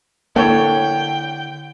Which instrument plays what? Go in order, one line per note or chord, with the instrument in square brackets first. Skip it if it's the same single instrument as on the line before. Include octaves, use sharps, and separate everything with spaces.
[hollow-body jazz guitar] D3 D4 E4 [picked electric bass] A#3 [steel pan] A4 C#5 [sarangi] G5